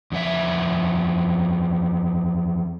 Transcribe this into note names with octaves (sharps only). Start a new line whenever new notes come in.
E2 F3 E5